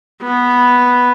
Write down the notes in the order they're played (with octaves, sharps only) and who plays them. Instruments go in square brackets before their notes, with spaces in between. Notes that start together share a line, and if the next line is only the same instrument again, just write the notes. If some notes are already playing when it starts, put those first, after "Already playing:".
[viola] B3